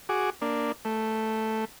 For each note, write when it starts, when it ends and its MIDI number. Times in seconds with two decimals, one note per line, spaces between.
0.09 0.30 66
0.09 0.30 68
0.09 0.30 86
0.42 0.72 58
0.42 0.72 62
0.85 1.65 57